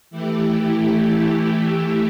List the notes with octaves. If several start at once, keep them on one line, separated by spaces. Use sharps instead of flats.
E3 A3 E4 G4